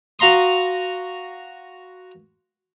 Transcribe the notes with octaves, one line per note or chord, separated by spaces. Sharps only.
F#4 F5 A#5 C6 D#6